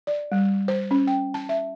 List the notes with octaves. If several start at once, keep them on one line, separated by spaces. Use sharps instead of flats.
D5
G3
C5
C#4
G5
A5
E5